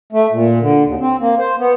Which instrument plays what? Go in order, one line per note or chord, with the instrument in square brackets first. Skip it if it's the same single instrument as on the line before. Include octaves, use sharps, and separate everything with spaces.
[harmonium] A3
A#2
D3
D#2
C4
A#3
C5
B3